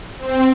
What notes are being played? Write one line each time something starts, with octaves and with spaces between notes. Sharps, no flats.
C4